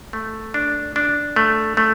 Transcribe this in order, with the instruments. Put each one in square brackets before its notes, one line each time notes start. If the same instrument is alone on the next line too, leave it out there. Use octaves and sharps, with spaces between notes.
[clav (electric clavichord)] A3
D4
D4
A3
A3